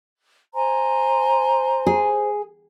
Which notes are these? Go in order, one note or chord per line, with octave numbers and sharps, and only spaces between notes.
C5 G#5 A#5 C6
G#4